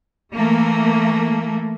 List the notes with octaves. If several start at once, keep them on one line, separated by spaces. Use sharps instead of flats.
E3 A3 A#3